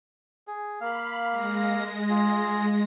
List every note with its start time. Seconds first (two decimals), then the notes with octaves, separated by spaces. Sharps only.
0.48 G#4
0.81 A#3 F5 B5
1.30 G#3 A#6
2.10 F4 G#4